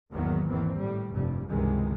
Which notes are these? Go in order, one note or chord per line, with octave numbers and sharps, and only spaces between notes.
G#1 E2 D#3 F#3 A#3 B3
E2 D#3 E3 C4
A2 G3
F1 G2 G3
C#2 G2 C3 D#3 E3 G#3